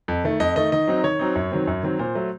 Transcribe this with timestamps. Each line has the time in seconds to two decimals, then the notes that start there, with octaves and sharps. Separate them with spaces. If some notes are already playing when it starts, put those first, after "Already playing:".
0.08 F2
0.24 D#3 A3
0.40 F2 D#5
0.56 D#3 A3 D#5
0.72 D#3 D#5
0.87 F#3 C4 D#4
1.04 D#3 C#5
1.19 F#3 C4 D#4
1.36 F#2
1.51 D#3 F#3 C4
1.67 F#2
1.83 D#3 F#3 C4
1.99 A#2 C5
2.15 F#3 A3